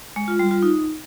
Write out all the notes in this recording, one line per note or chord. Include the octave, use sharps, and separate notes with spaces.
G#3
F4
G3
F4
D#4